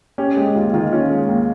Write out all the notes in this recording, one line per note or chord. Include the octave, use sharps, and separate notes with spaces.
C#4 G4
G#3 G4
D#2 F4
D#3 F4
C#4 F4
G#3
D#2